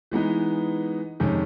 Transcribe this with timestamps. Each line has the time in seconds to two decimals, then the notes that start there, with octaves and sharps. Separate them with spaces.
0.11 E3 G#3 B3 D#4
1.20 F2 C3 D#3 G#3 C#4